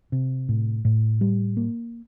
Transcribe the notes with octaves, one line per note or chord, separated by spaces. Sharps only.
C3
A2
A2
G3
A#3